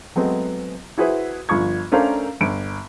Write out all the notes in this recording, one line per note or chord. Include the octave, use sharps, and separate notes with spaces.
F#3 G#3 A3 B3 C4
E4 F#4 G#4 B4 C5 E5
G1 F3 F4 C#6 G#6
A3 C#4 D4 A#4 C5 F5
G1 D7